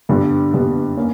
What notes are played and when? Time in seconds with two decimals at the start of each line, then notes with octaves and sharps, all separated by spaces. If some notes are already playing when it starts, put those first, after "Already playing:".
0.09 G2 D3 G3 B3
0.53 G2 D3 G3 B3
0.97 A#3 C#4